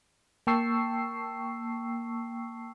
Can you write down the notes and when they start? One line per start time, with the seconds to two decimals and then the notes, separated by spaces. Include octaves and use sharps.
0.47 A#3 G5 A5 C#6 E6 C7